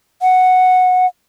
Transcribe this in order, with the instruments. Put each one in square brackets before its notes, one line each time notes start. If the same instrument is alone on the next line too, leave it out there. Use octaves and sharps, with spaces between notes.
[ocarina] F#5